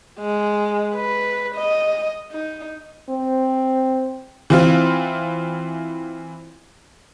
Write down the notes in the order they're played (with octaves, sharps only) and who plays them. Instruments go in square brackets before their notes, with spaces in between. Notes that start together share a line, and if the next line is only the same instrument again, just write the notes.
[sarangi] G#3
B4
D#5
D#4
[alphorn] C4
[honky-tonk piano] E3 C4 F4